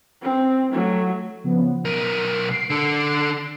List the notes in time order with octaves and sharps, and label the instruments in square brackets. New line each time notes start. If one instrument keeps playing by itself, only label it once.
[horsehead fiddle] C4
F#3 A3
[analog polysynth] C#3 F3 B3
[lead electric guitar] B1 A#4 [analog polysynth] D#7
[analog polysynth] C7 D7
[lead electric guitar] D3 A4